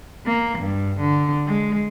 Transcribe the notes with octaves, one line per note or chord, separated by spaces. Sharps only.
A#3
G2
D3
G#3